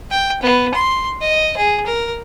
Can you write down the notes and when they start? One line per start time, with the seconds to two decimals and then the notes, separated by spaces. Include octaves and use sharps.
0.11 G5
0.43 B3
0.74 C6
1.21 D#5
1.57 G#4
1.87 A#4